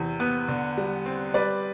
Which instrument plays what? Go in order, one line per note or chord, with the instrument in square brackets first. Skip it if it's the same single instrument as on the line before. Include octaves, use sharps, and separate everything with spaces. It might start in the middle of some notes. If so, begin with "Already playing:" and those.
Already playing: [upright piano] E2 C3
B3
D3
G3
C4
G3 B4 D5